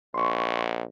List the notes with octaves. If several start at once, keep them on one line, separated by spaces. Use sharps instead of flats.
A#1 C6 C#6